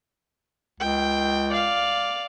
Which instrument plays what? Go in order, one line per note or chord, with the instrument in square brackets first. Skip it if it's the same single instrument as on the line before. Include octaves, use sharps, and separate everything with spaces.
[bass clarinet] C#2 [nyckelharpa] G5
[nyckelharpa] D5 F5